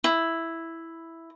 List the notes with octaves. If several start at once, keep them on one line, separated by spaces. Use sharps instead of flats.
E4